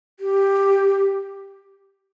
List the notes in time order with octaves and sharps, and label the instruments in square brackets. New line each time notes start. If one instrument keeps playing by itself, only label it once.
[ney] G4